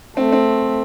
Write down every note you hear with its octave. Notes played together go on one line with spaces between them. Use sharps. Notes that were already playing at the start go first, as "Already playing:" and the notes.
A3 C4
C4